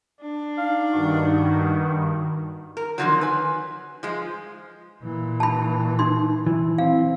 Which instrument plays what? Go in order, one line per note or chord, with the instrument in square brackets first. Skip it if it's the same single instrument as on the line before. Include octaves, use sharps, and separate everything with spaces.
[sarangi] D4
[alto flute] D#4 [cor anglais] F5
[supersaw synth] G2 D#3 [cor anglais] F#4
[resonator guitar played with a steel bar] A#4
F2 B2 D3 D#3 F3 F#3
B4 G#5
F3 G#3
[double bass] A#2 E3
[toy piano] A5 B5
D#4 C6
[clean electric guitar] E3
[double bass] C4 [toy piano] F5